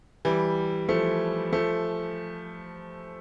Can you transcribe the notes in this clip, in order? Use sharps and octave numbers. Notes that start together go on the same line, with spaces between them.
E3 G3
F3 A3
F3 A3